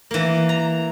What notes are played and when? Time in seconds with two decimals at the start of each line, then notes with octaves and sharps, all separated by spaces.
0.11 E3 A#3
0.49 A#5